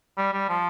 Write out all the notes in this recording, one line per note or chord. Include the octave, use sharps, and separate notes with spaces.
G3
G3
F3